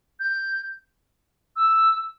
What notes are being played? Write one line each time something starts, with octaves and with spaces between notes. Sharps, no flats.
G6
E6